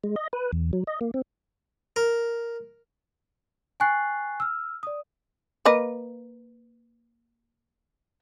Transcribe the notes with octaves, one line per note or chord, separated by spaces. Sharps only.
G#3
D#5
B4
E2
F#3
D#5
A#3
C4
A#4
G5 G#5 C#6 F#6 A6 C7
E6 F6
D5 D#6
A#3 B4 D#5